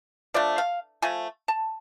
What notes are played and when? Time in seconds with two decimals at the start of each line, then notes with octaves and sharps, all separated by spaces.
0.34 F3 A3 D4 D5
0.58 F5
1.02 F3 A3 G#5
1.48 A5